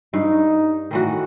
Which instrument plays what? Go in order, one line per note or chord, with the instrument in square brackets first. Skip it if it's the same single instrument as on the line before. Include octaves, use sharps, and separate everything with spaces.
[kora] G2 [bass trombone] D#4
[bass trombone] A2 [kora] D#3 E3 F#4